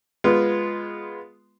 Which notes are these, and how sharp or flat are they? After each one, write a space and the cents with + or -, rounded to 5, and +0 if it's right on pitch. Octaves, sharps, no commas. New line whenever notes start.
G#3 +0 B3 +0 F4 +0